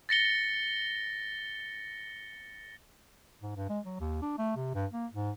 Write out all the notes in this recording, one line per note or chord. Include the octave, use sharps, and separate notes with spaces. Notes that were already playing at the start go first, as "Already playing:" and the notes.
A6 A#6 C#7 G7
G#2
G2
G#3
F#3
D#2
D4
A3
C3
G2
A#3
G#2